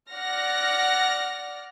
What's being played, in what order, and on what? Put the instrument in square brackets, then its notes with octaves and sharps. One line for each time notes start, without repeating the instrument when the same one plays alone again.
[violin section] D5 F#5 F6 A#6